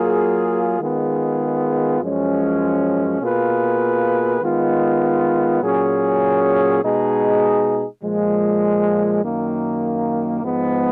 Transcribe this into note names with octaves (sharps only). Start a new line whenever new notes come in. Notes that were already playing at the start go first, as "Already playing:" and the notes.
Already playing: F#3 A#3 F4 G#4
D#3 G#3 B3 F4 G#4
F#2 F3 G#3 C#4
B2 A#3 F4 G#4 B4
D#3 G#3 B3 F4
A#2 F#3 C#4 G#4
B2 G#3 D#4 G#4
A#2 F3 G#3
F#2 D#3 A#3
G#2 F3 G#3 B3